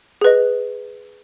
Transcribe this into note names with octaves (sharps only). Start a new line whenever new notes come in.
G#4 B4 D#5